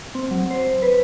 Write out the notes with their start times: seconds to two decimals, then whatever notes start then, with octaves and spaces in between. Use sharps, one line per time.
0.15 C4
0.31 F#3
0.51 C5
0.82 B4